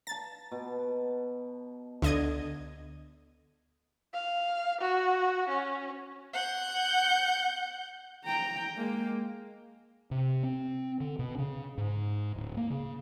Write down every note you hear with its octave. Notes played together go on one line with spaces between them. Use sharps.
A5 A#5 A6
B2
D2 D3 D#5 G#6
F5
F#4
C#4
F#5 G6
G5 A#5
G#3 A#3
C3
C4
D3
B2
C#3
G#2
D1
A#3
C#3